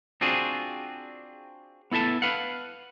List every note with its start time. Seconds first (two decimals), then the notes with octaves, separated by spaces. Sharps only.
0.21 C4 D4 F4 F#4 G#4
1.91 B3 E4 A4 E5 A5
2.22 B4 F5 F#5